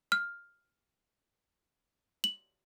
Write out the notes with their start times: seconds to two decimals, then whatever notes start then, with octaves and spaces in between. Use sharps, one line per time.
0.12 F6
2.24 F#7